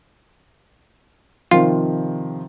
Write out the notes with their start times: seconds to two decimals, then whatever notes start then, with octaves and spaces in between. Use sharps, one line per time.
1.51 C3 D#3 F3 F4